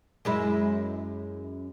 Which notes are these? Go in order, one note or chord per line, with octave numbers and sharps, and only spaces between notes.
F#2 G#3 E4